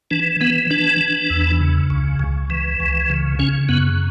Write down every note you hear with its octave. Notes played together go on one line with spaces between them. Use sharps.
E3 D4
E3 B3
E3 D4
E3
E2
C#3
C#2
C#2
E3
C#2
C#3
C#3 C#4
F#2 B3